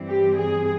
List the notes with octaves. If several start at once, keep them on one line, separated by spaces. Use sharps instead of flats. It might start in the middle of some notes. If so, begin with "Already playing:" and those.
Already playing: G2 E3 G3 C4
G4
G#4